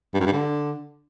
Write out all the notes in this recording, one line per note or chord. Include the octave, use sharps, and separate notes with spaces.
G2
F#2
G2
D3